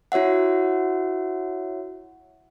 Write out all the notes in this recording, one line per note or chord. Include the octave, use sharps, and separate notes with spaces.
E4 F#4 C#5 E5 F#5